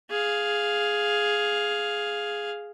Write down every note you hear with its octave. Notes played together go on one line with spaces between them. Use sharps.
G#4 F5